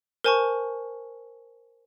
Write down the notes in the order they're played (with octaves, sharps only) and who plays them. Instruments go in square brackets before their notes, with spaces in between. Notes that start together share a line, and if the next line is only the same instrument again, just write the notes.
[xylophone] A#4 C5 G#5 A5 C#6